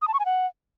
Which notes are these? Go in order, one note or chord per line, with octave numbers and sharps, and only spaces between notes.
D#6
A5
C#6
G#5
F#5